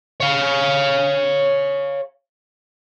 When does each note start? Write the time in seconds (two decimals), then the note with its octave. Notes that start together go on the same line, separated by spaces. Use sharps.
0.20 C#5 F5